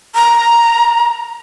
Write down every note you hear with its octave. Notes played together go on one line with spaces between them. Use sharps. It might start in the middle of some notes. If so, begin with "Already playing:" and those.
A#5